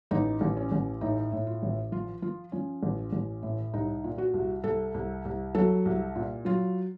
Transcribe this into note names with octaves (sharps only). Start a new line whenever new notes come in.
A1 D#4
A1
C#4
A1
A2 D#4
A2
F4
A1
F3 F4
F3 F4
F3 C#4
A1
A1
A2
C2 D#4
A#2
F#4
C2
C2 A4
C2
C2
F#3 A4
C2
A#2
F#3 F4